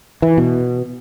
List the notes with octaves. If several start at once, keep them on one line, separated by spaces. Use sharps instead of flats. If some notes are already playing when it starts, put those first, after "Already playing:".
E3
B2